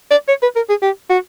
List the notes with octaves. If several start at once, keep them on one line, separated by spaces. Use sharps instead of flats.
D5
C#5
B4
A#4
G#4
G4
F#4